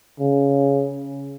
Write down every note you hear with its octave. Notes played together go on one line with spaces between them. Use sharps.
C#3